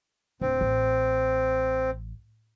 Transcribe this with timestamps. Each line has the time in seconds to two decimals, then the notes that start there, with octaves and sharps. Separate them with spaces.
0.41 D1 C4
0.61 A1